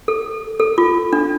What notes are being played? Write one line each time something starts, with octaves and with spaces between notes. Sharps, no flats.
A4
A4
F4
D4